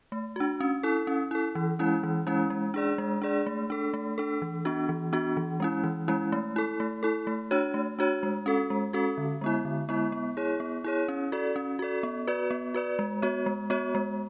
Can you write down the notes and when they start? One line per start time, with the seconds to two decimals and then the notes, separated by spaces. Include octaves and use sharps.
0.12 A3
0.36 D4 F#4
0.60 C#4
0.83 E4 A4
1.07 C#4
1.31 E4 A4
1.55 E3
1.79 G#3 C#4 E4
2.03 E3
2.27 G#3 C#4 E4
2.50 G#3
2.74 D4 G#4 D5
2.98 G#3
3.22 D4 G#4 D5
3.46 A3
3.70 D4 A4
3.94 A3
4.18 D4 A4
4.42 E3
4.65 B3 D4 F#4
4.89 E3
5.13 B3 D4 F#4
5.37 E3
5.60 G#3 C#4 E4
5.84 E3
6.08 G#3 C#4 E4
6.32 A3
6.56 E4 A4
6.80 A3
7.03 E4 A4
7.27 A3
7.51 D4 F#4 C#5
7.74 A3
7.99 D4 F#4 C#5
8.23 G#3
8.46 C#4 F#4 A4
8.70 G#3
8.93 C#4 F#4 A4
9.18 D3
9.41 G#3 B3 E4
9.65 D3
9.89 G#3 B3 E4
10.12 B3
10.37 E4 G#4 C#5
10.60 B3
10.84 E4 G#4 C#5
11.08 C#4
11.32 F#4 A4 D5
11.56 C#4
11.79 F#4 A4 D5
12.03 B3
12.27 F#4 B4 D5
12.50 B3
12.74 F#4 B4 D5
12.99 G#3
13.22 B3 F#4 C#5
13.46 G#3
13.70 B3 F#4 C#5
13.95 G#3